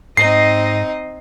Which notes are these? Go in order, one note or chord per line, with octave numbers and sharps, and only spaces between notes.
G#2 C4 D#4 D#5 C7